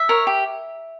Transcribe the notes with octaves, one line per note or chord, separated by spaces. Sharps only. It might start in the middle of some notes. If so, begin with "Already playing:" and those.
Already playing: E5
A#4 C#5
G4